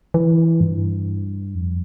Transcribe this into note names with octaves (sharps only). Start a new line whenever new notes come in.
E3
G2
F2